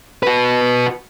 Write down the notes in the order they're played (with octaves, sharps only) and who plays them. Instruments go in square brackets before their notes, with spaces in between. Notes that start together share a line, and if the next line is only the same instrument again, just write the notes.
[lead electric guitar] F#4 B4